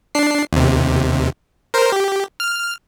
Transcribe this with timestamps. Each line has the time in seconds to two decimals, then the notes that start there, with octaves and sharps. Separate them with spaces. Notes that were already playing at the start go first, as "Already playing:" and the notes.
0.15 D4 C7
0.53 D#2 C3
1.74 A#4 C5
1.92 G4
2.40 F6